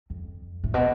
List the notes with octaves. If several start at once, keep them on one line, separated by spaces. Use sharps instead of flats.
F2
A2
B2